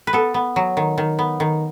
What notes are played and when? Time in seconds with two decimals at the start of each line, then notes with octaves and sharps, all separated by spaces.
0.07 B4
0.13 B3 A4
0.34 B3
0.56 F#3
0.77 D#3
0.98 D#3
1.19 B3
1.40 D#3